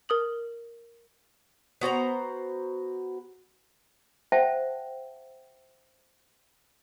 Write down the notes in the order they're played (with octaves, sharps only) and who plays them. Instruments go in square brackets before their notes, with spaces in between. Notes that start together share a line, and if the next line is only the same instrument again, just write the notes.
[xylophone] A#4 D#6 F#7
[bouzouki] B3 F#4 C5 A#5
[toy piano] C5 E5 F#5 G5 A5